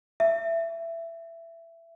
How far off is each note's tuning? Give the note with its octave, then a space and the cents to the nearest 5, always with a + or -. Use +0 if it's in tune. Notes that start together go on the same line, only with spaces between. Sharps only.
E5 +15